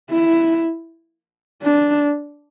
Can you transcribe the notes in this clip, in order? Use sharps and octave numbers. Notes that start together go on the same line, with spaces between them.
E4
D4